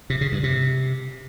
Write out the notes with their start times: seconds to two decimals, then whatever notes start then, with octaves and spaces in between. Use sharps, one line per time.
0.10 C3
0.21 C#3
0.32 G2
0.43 C3